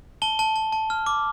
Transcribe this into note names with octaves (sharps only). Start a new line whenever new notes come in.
A5 G7
A5
A5
A5
F6
D6